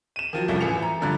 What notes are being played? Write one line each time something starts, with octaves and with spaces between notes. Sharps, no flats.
D#7 E7
D#3 F3 F#3
F1 C2 G2 F3 C#4
A1 E3 C#7 F7
A#5
G2 D3 F3